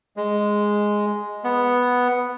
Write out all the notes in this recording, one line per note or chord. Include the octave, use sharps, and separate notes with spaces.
G#3
B3